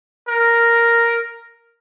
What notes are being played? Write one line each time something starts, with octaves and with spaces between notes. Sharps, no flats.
A#4